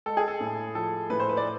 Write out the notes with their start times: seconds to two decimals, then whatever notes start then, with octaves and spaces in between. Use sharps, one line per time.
0.06 G#3 A4
0.17 G#4
0.28 A4
0.40 A2
0.75 F3 A4
1.10 A2 B4
1.20 C5
1.29 B4
1.37 D5